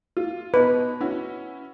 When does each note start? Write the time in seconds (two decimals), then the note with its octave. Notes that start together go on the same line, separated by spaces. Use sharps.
0.17 F4
0.54 B2 D#4 B4
1.01 C#4 E4 F#4